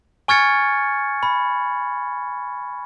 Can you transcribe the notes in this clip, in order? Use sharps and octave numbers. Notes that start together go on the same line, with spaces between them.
G#5 C#6 F6 G#6 A6 C#7
B5